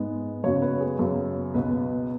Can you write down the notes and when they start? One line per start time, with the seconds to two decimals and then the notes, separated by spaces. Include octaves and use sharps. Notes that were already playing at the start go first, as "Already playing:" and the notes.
Already playing: G#2 G#3 B3
0.44 F#2 C#3 F#3 B3 C#5
0.62 B4
0.81 G#4
0.99 F#2 C#3 F#3 B3
1.54 C#2 B2 B3 B4